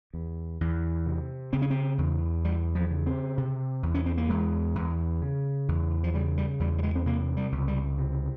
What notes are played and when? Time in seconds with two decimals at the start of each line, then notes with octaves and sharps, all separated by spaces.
0.14 E2
0.61 E2
1.06 C3
1.53 C#3 C4
1.62 C#4
1.70 C4
1.98 E2
2.44 E2 G3
2.75 F3
2.91 C#3
3.06 C4
3.38 C3
3.83 E2
3.94 C#4
4.06 C4
4.17 A#3
4.29 E2 G#3
4.75 E2
5.22 C#3
5.68 E2
6.04 F3
6.14 C#3 G3
6.38 G3
6.60 E2 G3
6.78 G3
6.83 G#3
6.95 C4
7.06 C3 A#3
7.37 G3
7.52 C#2
7.68 G3
7.98 C3